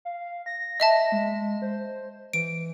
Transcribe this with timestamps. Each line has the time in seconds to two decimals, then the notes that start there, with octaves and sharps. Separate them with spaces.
0.05 F5
0.46 A#6
0.80 D#5 E5 A5
1.12 G#3
1.62 C5
2.33 E3 D7